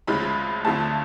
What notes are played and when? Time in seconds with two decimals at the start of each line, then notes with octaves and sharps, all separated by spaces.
0.07 D2 C#3 F3 G#3 B5
0.65 D2 D3 F3 A3 A5